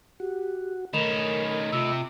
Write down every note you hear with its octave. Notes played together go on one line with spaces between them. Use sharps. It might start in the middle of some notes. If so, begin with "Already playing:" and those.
F#4 G4
D#3 A3 C#4 A#4 D#5 B5 E7 F7
C3 F4 E6